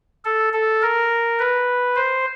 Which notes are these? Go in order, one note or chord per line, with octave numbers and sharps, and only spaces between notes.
A4
A4
A#4
B4
C5